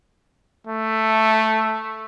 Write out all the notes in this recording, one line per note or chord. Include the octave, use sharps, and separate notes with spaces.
A3